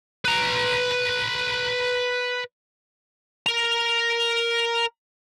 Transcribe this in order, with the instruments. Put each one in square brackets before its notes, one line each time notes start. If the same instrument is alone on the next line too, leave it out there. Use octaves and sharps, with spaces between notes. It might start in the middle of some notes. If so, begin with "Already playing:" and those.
[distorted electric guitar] B4 A#5
A#4 A#5